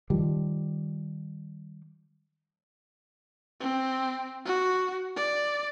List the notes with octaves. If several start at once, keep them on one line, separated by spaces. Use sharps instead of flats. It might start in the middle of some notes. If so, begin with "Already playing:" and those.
D#3 F3 G3
C4
F#4
D5